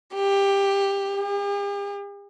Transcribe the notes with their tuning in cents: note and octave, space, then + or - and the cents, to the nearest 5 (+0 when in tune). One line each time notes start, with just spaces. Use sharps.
G4 +15
G4 +45